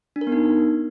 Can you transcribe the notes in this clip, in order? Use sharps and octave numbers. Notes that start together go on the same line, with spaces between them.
D4
A#4
B3
D#4